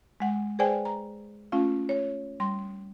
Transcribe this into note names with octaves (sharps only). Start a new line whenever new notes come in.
G#3 F#5
G#4 B4 C5 D5 G5 G#5
A#5
A3 C#4 F4 F5
C#5
G3 C6